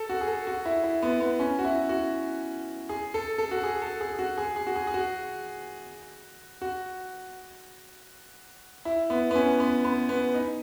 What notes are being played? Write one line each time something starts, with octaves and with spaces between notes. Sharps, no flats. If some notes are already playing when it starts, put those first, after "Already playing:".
Already playing: A4
F#4
G#4
A4
F#4
E4
E4
B3
B3
C#4
F#4
E4
F#4
G#4
A4
A4
F#4
G#4
A4
G#4
F#4
G#4
G#4
F#4
G#4
G#4
F#4
F#4
E4
B3
B3
C#4
B3
B3
B3
D#4